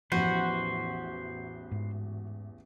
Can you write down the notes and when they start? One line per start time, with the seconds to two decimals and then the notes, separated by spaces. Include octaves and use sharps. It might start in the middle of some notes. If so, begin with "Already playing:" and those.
0.12 A1 E2 F3 F#4 B4 C5
1.71 G#2